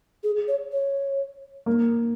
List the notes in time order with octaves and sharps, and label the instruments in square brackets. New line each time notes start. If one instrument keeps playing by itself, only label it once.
[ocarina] G#4
C#5
C#5
[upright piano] A#3